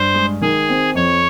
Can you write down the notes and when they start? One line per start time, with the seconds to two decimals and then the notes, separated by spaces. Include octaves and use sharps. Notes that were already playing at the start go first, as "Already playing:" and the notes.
Already playing: G2 C5
0.14 G#3
0.41 D#3 G#4
0.69 C4
0.95 F2 C#5